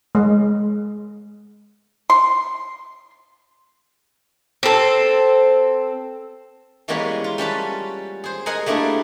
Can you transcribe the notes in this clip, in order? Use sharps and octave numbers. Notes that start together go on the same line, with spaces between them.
G#3
C6
C4 A4
E3 G3 G#3 A#3 B3 C#4
F4
G3 C#4 B4 A5
G#4 C5
G#4 A#4 D#5 F#5 G#5 A#5
G3 A3 A#3 D4 E4 G#4